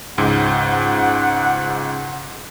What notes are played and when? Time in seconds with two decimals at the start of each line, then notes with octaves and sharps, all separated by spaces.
0.18 C#2 G#2 F#5